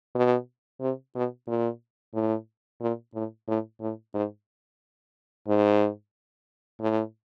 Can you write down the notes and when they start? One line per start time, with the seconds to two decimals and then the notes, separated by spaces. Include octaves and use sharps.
0.15 B2
0.81 C3
1.15 B2
1.48 A#2
2.14 A2
2.81 A#2
3.15 A2
3.48 A2
3.81 A2
4.14 G#2
5.48 G#2
6.81 A2